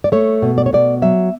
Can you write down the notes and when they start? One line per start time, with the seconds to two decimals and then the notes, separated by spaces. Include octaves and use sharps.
0.04 D5
0.12 A3 C#5
0.42 B2
0.58 D5
0.66 C#5
0.73 B2 D5
1.02 F#3 E5